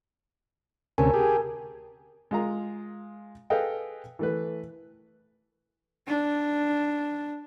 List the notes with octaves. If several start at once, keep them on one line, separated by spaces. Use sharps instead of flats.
D2 C3 C#4 A#4 G#5 A5
G4 G#4
G#3 F4 A#5
G#4 A4 B4 D#5 F5 G5
E3 A3 B4
D4